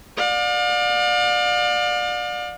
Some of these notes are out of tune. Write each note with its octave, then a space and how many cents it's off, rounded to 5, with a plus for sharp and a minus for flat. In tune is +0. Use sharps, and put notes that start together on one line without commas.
D5 +25 F5 +40